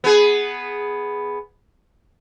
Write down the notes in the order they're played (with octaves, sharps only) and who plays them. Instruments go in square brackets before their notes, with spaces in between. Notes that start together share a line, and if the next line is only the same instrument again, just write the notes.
[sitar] B3 G#4